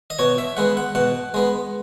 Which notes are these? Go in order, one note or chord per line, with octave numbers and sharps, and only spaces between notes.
D#5
B2 C#5
E5
G#3 B3 F#5
F#5
B2 F#5
G#3 B3